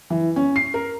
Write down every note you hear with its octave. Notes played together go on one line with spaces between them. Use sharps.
E3
C#4
C7
A#4